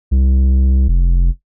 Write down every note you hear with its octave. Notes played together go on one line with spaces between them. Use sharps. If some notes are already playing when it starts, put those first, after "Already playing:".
C2
F1